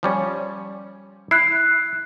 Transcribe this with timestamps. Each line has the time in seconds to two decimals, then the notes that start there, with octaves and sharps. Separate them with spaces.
0.03 F3 G3 C#4
1.31 E4 F#6 C7